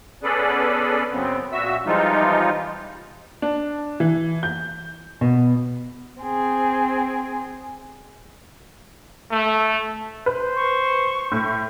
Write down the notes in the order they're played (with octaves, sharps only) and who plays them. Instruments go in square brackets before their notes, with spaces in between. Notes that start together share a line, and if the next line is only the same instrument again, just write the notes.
[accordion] B3 C#4 G#4 A4 B4 D5
F#2 C#3 B3 C4
A#2 F#4 E5 E6
E3 F3 G3 G#3 D#4 F4
[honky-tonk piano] D4
E3
G6
[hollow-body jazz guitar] B2
[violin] C4 G#4
[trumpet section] A3
[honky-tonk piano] B4 [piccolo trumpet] C5
[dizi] C#6
[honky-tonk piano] A2